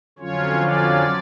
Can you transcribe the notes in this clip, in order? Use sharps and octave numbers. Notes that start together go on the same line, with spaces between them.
F2 D3 F#3 C#4 F4 C#5
D5